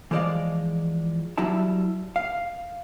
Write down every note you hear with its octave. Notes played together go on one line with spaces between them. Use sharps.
E3 F3 G#3 D5 D#5 F5
F#3 G3 E4 E5 A5
F5